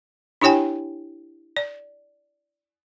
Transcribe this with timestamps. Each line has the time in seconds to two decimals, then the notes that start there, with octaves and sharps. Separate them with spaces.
0.41 D4 E4 G4 C#5 G5 G#5
1.57 D5